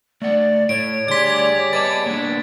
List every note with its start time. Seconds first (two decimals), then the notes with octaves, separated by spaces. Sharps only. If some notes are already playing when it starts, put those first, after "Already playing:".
0.22 A3 D5 F#5
0.69 A2 C#5 D7
1.08 D2 G3 G#4 D5 C6 G#6 B6
1.73 B4 D#5 A5 A6
2.06 A#3 B3 D4